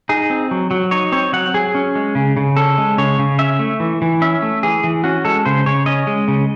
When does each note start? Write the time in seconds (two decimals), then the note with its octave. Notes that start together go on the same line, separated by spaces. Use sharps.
0.09 D#4 G#4
0.30 C4
0.51 F#3
0.71 F#3
0.91 D#4 C#5
1.12 C4 C#5
1.33 F#3 F#5
1.54 F#3 G#4
1.75 C#4
1.96 G#3
2.15 C#3
2.37 C#3
2.57 C#4 A4
2.78 G#3
2.98 C#3 C#5
3.19 C#3
3.39 C#4 E5
3.59 A3
3.80 E3
4.02 E3
4.22 C#4 E5
4.42 A3
4.63 E3 G#4
4.84 E3
5.04 C#4 F#4
5.25 G#3 A4
5.45 C#3 C5
5.66 C#3 C#5
5.86 C#4 D#5
6.07 G#3
6.28 C#3